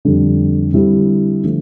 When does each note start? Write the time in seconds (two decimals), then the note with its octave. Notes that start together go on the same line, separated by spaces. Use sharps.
0.05 F2 D3 G3
0.73 D3 G3 C4 E4 G4
1.43 D3 F3 A3